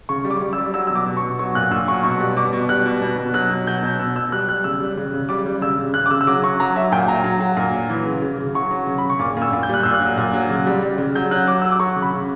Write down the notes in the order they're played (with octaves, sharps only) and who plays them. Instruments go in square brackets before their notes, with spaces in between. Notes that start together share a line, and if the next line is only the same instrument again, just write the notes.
[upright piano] C#3 C#6
G3
D6
G3
E6
G3
F#3 E6
B2 E6
D6
B2
C#6
B2
F#3 C#6
A#2 F#6
A#2 E6
F#3 C#6
B2 C#6
G3
B2 D6
B2
G3 F#6
B2
B2
B2
F#3 F#6
B2
F#3 G6
B2
B2 E6
B2 E6
G3 F#6
G3 F#6
C#3 E6
G3
C#3
C#3
G3 D6
G3
C#3 E6
C#3
C#3 F#6
D6
C#3 E6
E6
F#3 D6
F#3 C#6
F#3 A#5
F#3 E5
A#2 G5
F#3 A#5
F#3
F#3
A#2
F#3
E3
C#3
C#3
C#3
F#3 C#6
F#3
C#3
B5
C#3
C#6
A#2 D6
A#2
E6
A#2
G6
G3 F#6
A#2 E6
F#6
F#3
A#2
F#3
C#3
G3
G3
C#3
F#3 G6
F#3 F#6
F#3 D6
F#3 E6
D6
F#3 C#6
C#3
B5
C#3